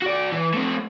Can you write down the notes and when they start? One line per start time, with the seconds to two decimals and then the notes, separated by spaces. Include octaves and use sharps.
0.02 F#4 D5
0.33 E3
0.54 A3 C4